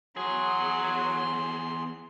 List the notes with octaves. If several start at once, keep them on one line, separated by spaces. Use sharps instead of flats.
E2 F#3 G#4 C6